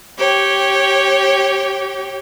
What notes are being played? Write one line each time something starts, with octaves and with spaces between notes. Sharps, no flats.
G4 C#5 G5